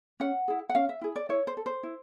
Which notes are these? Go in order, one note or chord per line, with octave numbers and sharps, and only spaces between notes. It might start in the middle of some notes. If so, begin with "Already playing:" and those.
C#4 F#5
E4 G#4
F#5
C#4 F5
E5
E4 G#4
D5
E4 C#5
C5
A4
C5
E4